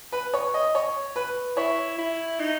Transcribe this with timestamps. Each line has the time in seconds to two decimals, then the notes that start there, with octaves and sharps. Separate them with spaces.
0.12 B4
0.34 C#5
0.54 D#5
0.75 C#5
1.16 B4
1.57 E4 C#5
1.98 E4
2.39 D#4